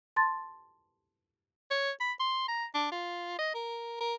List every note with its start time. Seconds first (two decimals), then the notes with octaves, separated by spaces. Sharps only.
0.16 A5 C6 A6
1.70 C#5
2.00 B5
2.20 C6
2.48 A#5
2.74 D4
2.91 F4
3.38 D#5
3.54 A#4
4.00 A#4